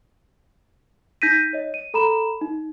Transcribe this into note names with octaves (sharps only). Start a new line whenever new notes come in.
D#4 G6 A#6 B6 D#7
C#5 D#5
D#7
A4 A#5 B5 E7
D#4